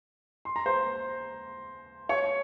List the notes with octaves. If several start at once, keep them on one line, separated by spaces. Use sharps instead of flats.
C6
A#5
C5 C6
C#5 C#6